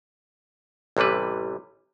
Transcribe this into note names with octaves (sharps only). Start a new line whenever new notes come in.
A1 C3 E3 G3 B4